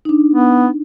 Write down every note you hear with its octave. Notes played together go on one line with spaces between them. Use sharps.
D4 D#4
B3